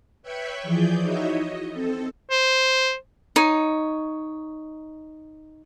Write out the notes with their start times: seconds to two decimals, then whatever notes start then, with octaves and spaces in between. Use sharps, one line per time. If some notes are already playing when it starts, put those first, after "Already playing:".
0.22 B4 C#5 E5 G5 B5 C#6
0.63 E3 F3 G#4 D5 G6
1.01 D#4 E4 F#4 C#5 D#5 E5
1.32 D#5
1.72 C4 A4
2.30 C5
3.36 D#4 C#5